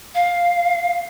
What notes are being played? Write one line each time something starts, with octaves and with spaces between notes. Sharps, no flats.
F5